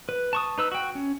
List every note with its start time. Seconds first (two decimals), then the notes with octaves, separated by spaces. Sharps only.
0.09 B4
0.33 A5 C#6 D#6
0.58 D#4 B4 E6
0.72 F#4 G5
0.95 C#4